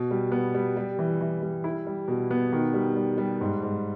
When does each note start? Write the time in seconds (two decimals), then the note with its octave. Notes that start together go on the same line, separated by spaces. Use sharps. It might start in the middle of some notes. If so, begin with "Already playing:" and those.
Already playing: B2
0.11 G3
0.32 B3
0.55 G3
0.77 G3
0.99 E3
1.21 E3
1.43 G3
1.64 E4
1.87 G3
2.08 B2
2.31 B3
2.52 D#3
2.74 G3
2.97 G3
3.18 G3
3.41 G#2
3.63 G#2